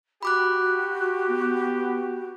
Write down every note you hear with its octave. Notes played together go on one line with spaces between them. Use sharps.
F#4 G4 B5 D6 F#6
B3